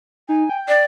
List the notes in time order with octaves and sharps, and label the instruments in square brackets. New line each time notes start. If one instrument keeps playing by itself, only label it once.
[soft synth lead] D#4 [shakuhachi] G#5
[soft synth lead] G5
[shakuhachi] D5